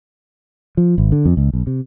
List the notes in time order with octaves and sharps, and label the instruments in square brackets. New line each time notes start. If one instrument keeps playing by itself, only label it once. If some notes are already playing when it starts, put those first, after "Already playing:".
[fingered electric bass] F3
G#1
D3
F2
C#2
B1
C3